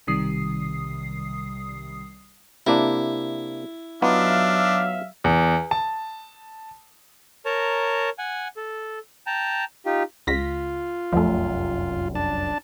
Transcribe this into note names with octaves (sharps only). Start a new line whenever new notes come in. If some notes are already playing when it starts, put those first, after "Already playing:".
B1 C3 D#3 G3 D#6 C7
C3 A#3 D4 E4
F#3 B3 D4 D#4 F4 E5 F5
E2
A5
A#4 C#5 A5 A#5
F#5 G#5
A4
G5 A5 A#5
D#4 F4 G4
C#2 F4 A#6 B6
F1 C2 F#2 F3 A3
D4 A5